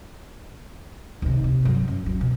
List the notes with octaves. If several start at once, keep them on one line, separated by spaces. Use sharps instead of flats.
D#2 C3
C3
G2 F#3
F#2
F#2 F#3
B2